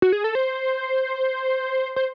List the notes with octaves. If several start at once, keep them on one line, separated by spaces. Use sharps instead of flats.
F#4
G#4
A4
C5
C5